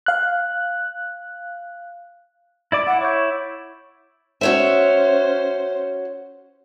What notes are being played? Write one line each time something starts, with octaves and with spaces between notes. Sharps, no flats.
F5 F#6
E4 D5 D6 E6 A6 D7
E4 F#5
C#5 D6 G6
C#4 F#4 C5 C#5 E5